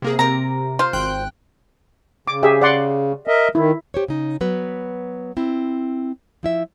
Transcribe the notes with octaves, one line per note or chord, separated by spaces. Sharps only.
C3 A#3 G#4
C3 A#4 A#5
F4 C5
G#1 G5 F#6
C#3 D6
G4 G#4 E5
D5 F#5 C6
A#4 D#5 E5
D#3 E4
G4 C5 C#5
C#3 D#4
F#3 B3 B4
C4 E4
F3 E4 E5